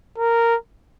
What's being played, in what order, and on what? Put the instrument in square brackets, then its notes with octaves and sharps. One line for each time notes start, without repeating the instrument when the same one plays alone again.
[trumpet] A#4